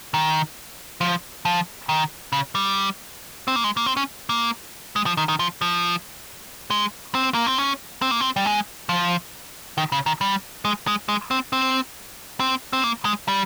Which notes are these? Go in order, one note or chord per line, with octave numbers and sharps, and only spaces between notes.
D#3
F3
F3
D#3
C#3
G3
C4
A#3
G#3
A#3
C4
C#4
A#3
G#3
F3
D#3
D#3
F3
F3
G#3
C4
A#3
C4
C#4
C4
A#3
C4
G3
G#3
F3
D#3
C#3
D#3
G3
G#3
G#3
G#3
C4
C4
C4
C4
A#3
G#3
G3